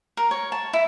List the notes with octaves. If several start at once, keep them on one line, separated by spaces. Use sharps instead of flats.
A#4
C#5
A5
E4